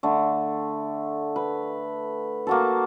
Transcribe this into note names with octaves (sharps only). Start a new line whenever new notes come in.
D3 A3
B4
A#3 F#4 A4